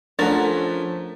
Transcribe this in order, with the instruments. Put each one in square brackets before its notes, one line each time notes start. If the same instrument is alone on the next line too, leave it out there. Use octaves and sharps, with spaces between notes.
[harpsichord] F3 C#4 [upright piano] A3 A6 [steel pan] D4 F#5 [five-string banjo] A#4